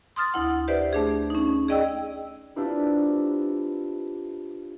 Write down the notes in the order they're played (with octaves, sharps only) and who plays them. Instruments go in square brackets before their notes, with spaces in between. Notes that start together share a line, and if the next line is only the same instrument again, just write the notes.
[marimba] C6 D#6 F6 A6
D2 E4 F#5
G4 B4 C5 D5 E5
A3 D4 G#4
C#4 D#4
G#4 D5 D#5 G5 E6
[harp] C4 D4 E4 F4 G4 B4